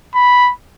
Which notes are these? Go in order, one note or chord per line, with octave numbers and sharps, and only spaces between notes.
B5